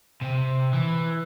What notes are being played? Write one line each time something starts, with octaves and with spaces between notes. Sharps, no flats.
C3
E3